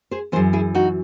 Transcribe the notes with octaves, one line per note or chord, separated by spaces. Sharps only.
G#4 C5
F#2 C#3 E3 G#4 C5
E4 G#4
D#4 F#4